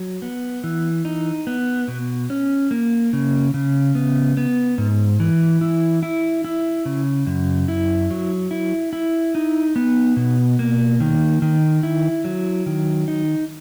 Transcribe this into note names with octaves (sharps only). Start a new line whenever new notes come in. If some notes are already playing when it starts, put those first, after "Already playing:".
Already playing: F#3
B3
E3
D#4
B3
B2
C#4
A#3
C#3
C#3
B3
B3
G#2
E3
E4
E4
E4
C#3
F#2
E4
F#3
E4
E4
D#4
B3
B2
A#3
D#3
D#3
E4
F#3
D#3
D#4